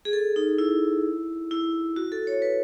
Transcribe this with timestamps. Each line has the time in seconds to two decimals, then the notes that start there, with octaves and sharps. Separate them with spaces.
0.05 G#4
0.13 A4
0.36 D#4
0.58 E4
1.51 E4
1.96 F#4
2.12 A4
2.27 C#5
2.42 B4